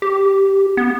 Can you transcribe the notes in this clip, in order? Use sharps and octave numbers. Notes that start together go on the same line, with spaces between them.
G4
B3